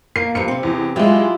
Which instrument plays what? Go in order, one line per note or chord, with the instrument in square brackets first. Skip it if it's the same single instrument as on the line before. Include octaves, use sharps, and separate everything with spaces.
[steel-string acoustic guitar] A#3 [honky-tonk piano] C7
[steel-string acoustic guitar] G2 F3 A#3 [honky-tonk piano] C#7
[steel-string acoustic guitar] C3 C4
[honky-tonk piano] E2
[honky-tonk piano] F#3 G#3 [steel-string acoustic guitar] E4 F4 G4